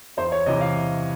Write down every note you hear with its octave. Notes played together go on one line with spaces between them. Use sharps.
E2 C5
C#5
C3 E3 D#5
F5